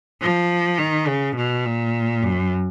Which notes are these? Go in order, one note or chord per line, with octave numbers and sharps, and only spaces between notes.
F3
D#3
C#3
B2
A#2
F#2